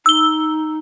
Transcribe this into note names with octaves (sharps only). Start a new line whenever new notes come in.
D#4 E6 G7